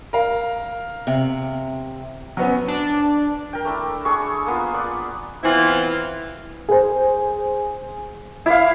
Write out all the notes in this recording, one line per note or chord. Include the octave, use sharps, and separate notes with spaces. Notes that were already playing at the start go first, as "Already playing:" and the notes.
A#4 F5
C3
F#3 B3 C#4
D4
A#4 G5
A3 D4 E4
D4 G#4 A4 C#6
A#3 B3 F4
D5 F#5
E3 B3 C4 E4 F4
G#4 C5
E4 F5